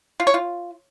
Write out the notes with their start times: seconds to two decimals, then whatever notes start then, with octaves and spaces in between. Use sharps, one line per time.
0.20 F4
0.27 C#5
0.34 F4